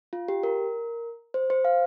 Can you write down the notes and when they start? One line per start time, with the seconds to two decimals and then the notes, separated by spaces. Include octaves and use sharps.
0.13 F4
0.28 G4
0.43 A#4
1.34 C5
1.50 C5
1.65 F5